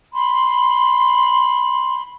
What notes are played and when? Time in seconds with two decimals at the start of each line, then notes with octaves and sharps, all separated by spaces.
0.13 B5 C6